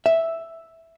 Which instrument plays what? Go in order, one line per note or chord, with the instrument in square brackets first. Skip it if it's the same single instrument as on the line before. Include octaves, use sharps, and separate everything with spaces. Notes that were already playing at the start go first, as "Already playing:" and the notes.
[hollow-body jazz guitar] E5